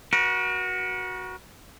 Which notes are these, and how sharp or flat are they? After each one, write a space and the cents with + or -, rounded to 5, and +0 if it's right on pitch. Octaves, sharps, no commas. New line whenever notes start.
F#4 +0 A#4 +45